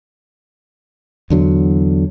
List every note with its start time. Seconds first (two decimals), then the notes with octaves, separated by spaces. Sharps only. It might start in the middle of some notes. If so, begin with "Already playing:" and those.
1.30 E2 D3 F#3